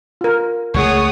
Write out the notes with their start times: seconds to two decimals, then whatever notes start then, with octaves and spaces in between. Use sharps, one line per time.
0.21 F4 A#4
0.74 C#2 F3 A3 G#4 C#5 F#5 D#6